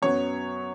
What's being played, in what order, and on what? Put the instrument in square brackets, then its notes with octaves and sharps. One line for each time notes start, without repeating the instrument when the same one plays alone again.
[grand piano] F#2 F#3 B3 C#5